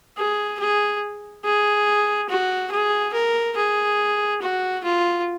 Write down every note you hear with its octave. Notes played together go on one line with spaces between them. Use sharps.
G#4
G#4
G#4
F#4
G#4
A#4
G#4
F#4
F4